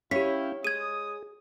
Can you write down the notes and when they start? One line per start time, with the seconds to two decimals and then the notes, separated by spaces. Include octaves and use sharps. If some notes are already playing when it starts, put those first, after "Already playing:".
0.11 C#4 E4 G4 C#5 F5 G5 B6
0.64 G#3 G#4 D#6 G#6 D#7